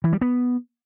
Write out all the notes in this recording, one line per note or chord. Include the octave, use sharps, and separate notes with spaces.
E3
G3
B3